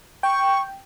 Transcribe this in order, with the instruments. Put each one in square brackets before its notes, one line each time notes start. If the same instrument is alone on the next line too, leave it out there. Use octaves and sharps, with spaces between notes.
[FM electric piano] G5 [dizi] C#6